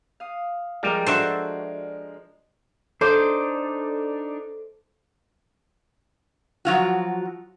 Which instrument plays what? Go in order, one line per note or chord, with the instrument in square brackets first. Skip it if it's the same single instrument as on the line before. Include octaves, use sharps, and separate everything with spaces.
[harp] F5 D#6
[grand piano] F3 G#3 A#4 [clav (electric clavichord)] G3
[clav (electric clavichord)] D4 E5 [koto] F#4 A4 C5
[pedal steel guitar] D4 D#4 [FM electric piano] A4 [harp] C5 D6
[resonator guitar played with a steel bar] F3 F#3 F4 F#4